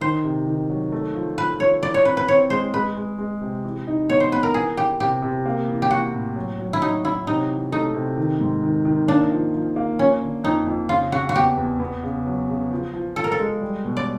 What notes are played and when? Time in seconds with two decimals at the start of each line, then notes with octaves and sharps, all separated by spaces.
0.01 D#3 C5
0.24 C3
0.47 D#3
0.69 F#3
0.92 A3
1.15 F3
1.38 F3 B4
1.60 F3 C#5
1.83 E3 D5
1.94 C#5
2.05 C4 B4
2.17 B4
2.28 C4 C#5
2.50 G#3 C5
2.74 G#3 B4
2.97 G#3
3.18 G#3
3.41 C3
3.64 E3
3.87 D#4
4.09 B3 C#5
4.20 C5
4.32 B3 B4
4.43 A#4
4.54 E3 G#4
4.77 E3 G4
5.00 C3 G4
5.22 C3
5.46 A#3
5.68 E3
5.82 G4
5.91 E3 F#4
6.13 A2
6.36 F#3
6.59 F#3
6.73 E4
6.82 F#3 D#4
7.04 F#3 E4
7.27 C3 D#4
7.50 E3
7.72 A3 D#4
7.94 C3
8.17 D#3
8.40 G#2
8.63 D#3
8.85 D#3
9.08 A#3 D4
9.31 F3
9.54 F3
9.76 A#3
9.99 F3 C#4
10.22 D3
10.44 F2 D#4
10.67 F2
10.89 C#3 F4
11.12 C#3 F#4
11.29 F#4
11.35 E2 G4
11.57 E2
11.80 B3
12.03 C#3
12.26 F#3
12.49 C#3
12.71 F3
12.94 F3
13.16 F3 A4
13.24 A#4
13.32 A4
13.40 G#3
13.61 G3
13.84 B2
13.97 D5